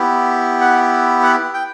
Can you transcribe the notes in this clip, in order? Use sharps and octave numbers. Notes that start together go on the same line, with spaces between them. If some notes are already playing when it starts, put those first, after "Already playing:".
Already playing: B3 E4 G4
F#5
F#5
G5